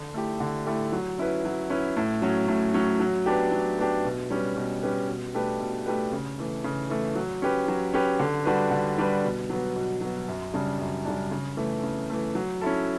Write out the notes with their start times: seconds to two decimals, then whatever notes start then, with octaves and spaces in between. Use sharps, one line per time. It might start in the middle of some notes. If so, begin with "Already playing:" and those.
Already playing: D3
0.14 A3 E4 G4
0.40 D3
0.66 A3 E4 G4
0.92 F#3
1.18 C#4 E4 B4
1.45 F#3
1.70 C#4 E4 B4
1.97 A2
2.22 F#3 C#4
2.48 A2
2.74 F#3 C#4
3.00 F#3
3.26 B3 D4 G4
3.52 F#3
3.78 B3 D4 G4
4.05 B2
4.30 G3 C#4 G4 B4
4.57 B2
4.83 G3 C#4 G4 B4
5.08 B2
5.34 A3 D4 G4 B4
5.60 B2
5.86 A3 D4 G4 B4
6.13 C#3
6.39 E3 A3
6.64 C#3
6.90 E3 A3
7.15 F#3
7.42 C#4 G4 B4
7.68 F#3
7.94 C#4 G4 B4
8.20 D3
8.45 G3 D4 F#4 B4
8.71 D3
8.98 G3 D4 F#4 B4
9.24 B2
9.50 F#3 B3
9.76 B2
10.01 F#3 B3
10.28 F#2
10.54 C#3 G3 D4
10.80 F#2
11.05 C#3 G3 D4
11.31 C#3
11.57 E3 A3
11.83 C#3
12.10 E3 A3
12.35 F#3
12.61 C#4 E4 A4